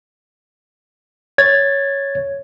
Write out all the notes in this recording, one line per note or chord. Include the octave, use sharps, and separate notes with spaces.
C#5 G#6 A6